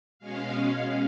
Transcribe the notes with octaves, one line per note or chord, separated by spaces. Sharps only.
B2 G#3 C#4 F5